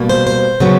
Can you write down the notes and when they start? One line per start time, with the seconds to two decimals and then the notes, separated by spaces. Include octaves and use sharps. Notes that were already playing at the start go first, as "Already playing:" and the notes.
Already playing: B2 G3 A#3
0.09 C5
0.27 C5
0.60 C#3 F#3 B3